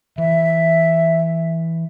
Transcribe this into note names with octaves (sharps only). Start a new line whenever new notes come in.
E3 E5